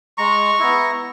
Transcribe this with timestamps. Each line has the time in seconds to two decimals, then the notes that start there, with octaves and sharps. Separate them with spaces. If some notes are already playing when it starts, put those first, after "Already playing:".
0.18 G#3 A#5 C#6
0.59 B3 E4